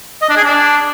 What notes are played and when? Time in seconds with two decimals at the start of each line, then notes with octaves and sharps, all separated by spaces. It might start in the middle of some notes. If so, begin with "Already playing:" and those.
0.22 D#5
0.29 D4
0.37 G#4
0.44 D4